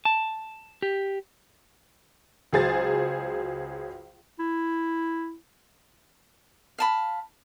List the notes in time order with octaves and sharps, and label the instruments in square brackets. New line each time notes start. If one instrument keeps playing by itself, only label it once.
[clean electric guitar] A5
G4
[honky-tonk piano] C#2 F#3 G#4 C5 A6
[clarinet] E4
[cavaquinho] F5 A5 B5